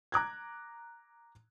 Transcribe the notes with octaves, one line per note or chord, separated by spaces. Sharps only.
A#5 D6 F#6 G#6